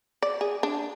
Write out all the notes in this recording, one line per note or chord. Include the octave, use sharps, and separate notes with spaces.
D5
G#4
D4